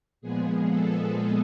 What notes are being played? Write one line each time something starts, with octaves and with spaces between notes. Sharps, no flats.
A#2 F3 G#3 B3 G#4
A4